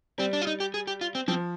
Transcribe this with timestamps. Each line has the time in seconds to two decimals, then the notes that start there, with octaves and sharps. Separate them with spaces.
0.18 G3 C4
0.33 D4
0.42 F4
0.47 D#4
0.60 G4
0.74 G#4
0.87 G4
1.01 F4
1.15 C4
1.28 F3 C4